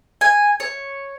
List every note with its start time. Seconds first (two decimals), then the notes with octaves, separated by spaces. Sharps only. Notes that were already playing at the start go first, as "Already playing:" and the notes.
0.21 G#5
0.60 C#5